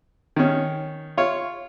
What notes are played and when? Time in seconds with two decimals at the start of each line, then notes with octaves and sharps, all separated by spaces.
0.36 D#3 C#4
1.17 F4 C#5